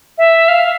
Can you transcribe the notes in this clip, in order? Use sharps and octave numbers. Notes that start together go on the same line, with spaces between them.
E5
F5